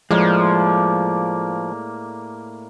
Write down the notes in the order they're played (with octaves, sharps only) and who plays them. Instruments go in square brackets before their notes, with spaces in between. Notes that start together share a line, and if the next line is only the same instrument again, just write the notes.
[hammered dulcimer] A2 A#3 D5 [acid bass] F3 [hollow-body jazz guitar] G#3